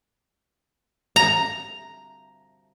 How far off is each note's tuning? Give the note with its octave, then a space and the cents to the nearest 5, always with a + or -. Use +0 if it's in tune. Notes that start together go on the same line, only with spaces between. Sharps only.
A#5 +0